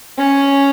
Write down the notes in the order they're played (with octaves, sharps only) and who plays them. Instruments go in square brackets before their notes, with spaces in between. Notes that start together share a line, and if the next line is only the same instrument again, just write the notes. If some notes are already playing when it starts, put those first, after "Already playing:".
[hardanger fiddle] C#4